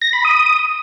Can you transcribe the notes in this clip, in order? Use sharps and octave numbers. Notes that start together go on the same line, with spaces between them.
A#6
B5
D#6